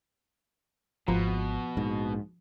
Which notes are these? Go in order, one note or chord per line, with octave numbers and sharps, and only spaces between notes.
G#1 B2 F3
A#1 G#2